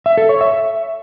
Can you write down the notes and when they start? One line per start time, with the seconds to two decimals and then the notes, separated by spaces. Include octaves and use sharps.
0.06 E5
0.18 A4
0.29 C#5
0.41 E5